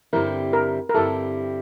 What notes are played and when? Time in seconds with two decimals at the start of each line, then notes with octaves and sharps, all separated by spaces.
0.13 G2 D3 G3 C4 E4 A#4
0.53 A#4
0.89 A#4
0.94 G2 D3 G3 C4 E4 A4